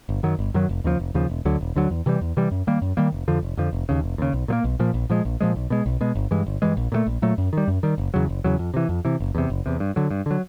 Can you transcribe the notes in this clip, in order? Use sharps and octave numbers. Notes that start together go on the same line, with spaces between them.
G1
F#2 D#3 F#3
G1
F#2 D#3 F#3
F1
D#2 C#3 F3
F1
D#2 C#3 F3
E1
D2 D3 F#3
E1
D2 D3 F#3
E2
C3 E3 G3
E2
C3 E3 G3
F#2
D#3 G3 A#3
F#2
D#3 G3 A#3
F1
F2 D3 F3
F1
F2 D3 F3
F1
D#2 C#3
F1
D#2 C#3
B1
A#2 F3 A#3
B1
A#2 F3 A#3
A#1
A#2 F3 G#3
A#1
A#2 F3 G#3
B1
B2 G#3
B1
B2 G#3
G1
G2 E3 G#3
G1
G2 E3 G#3
A#1
A#2 F#3 A3
A#1
A#2 F#3 A3
F#2
D#3 G3
F#2
D#3 G3
F#1
E2 C#3 F#3
F#1
E2 C#3 F#3
F2
C3 E3
F2
C3 E3
F#1
E2 C3
F#1
E2 C3
G2
D3 F#3
G2
D3 F#3